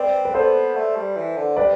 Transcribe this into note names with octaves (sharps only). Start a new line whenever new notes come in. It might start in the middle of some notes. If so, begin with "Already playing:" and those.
Already playing: C4 B4 D5
B4
B3 A4 C5
A3
G3
E3
D3
C3 B4 D5